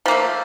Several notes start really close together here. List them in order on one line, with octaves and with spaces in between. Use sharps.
F3 A#3 A3